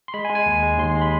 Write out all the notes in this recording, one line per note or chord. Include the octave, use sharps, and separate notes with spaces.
C6
G#3 B5
G#5
G#3
G#5
D#2
G#3
D#2 C6
C6
G#3
B5